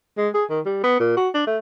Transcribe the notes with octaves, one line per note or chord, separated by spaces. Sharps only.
G#3
G#4
D#3
G3
B3
A#2
F#4
D4
A3